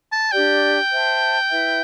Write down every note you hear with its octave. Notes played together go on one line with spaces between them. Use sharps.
A5
D4 G4 D5 G5
C5 E5 A5
E4 B4 E5